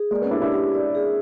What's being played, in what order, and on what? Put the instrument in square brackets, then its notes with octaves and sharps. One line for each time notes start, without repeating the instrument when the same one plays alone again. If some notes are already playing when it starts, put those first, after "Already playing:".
Already playing: [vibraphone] G#4
[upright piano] G#3 A#3 [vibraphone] D5
[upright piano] B3 C#4
[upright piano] D4 E4 [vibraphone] G4
[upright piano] D4 E4
[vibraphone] G4
D5
G#4